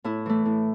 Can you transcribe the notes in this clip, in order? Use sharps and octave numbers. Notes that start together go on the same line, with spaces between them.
A2 E4
E3 A3
A2